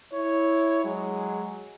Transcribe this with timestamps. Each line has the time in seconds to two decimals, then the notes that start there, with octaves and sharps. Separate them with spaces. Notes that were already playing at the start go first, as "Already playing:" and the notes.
0.12 E4 C#5
0.84 F#3 G#3